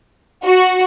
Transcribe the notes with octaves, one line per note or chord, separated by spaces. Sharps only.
F#4